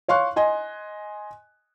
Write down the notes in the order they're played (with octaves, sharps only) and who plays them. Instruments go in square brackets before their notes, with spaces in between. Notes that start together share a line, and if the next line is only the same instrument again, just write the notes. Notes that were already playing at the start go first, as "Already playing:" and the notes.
[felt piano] C#5 F5 C6 C#6 F#6
D#5 G#5 C6